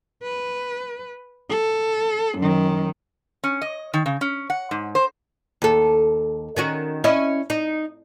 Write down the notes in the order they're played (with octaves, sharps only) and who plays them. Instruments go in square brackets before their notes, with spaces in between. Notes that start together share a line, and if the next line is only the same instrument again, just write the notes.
[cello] B4
A4
F#2 D#3
[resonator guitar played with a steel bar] C#4
D#5
D#3
C#3
C#4
F#5
G#2
C5
[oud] D#2 A4
D#3 C#4 F#4
C#4 E4 D#5
D#4